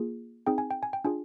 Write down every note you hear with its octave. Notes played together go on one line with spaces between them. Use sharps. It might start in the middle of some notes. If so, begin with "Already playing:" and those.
Already playing: A#3 F4 G#4
C4 D#4 G#4 G5
G#5
G5
G#5
G5
D4 F4 G#4 G#5